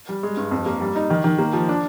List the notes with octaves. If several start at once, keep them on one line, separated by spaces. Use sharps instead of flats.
G3
G#3
G2
F2
A#3
G3
D#4
D#3
D#3
A#3
F3
D4